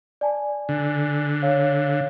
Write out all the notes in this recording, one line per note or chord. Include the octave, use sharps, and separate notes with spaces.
D5 G#5 A5
D3
C#5 F5